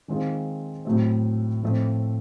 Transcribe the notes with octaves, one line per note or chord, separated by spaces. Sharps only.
D#3 G#3 C4 F4
A2 F#3 A3 C4
A2 F3 A3 C4